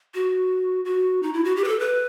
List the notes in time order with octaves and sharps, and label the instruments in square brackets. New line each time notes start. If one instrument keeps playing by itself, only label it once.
[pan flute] F#4
F#4
D#4
E4
F#4
G4
B4
A4
B4